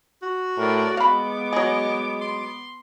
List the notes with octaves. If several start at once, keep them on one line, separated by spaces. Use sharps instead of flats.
F#4
A2 A#4 D5
G#3 B3 F5 B5 D6
F#3 G#4 D#5
C6